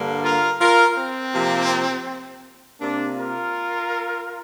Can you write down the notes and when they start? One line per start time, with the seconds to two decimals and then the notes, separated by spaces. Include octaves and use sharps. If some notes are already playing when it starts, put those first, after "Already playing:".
Already playing: G2 D3 A#3
0.24 F4 A#4
0.61 F4 A#4
0.97 C4
1.34 C3 F3 A#3
2.81 C3 A#3 D4
3.17 F4 A#4